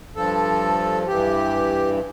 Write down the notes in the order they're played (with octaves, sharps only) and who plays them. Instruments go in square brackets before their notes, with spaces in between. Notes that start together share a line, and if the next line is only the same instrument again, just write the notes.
[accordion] G2 F3 A4
G2 E3 G4